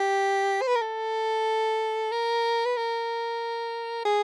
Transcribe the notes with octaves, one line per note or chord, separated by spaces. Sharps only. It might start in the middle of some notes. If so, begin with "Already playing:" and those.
Already playing: G4
C5
B4
A#4
A4
A#4
B4
A#4
G#4